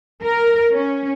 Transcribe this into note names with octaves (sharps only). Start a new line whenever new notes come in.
A#4
C#4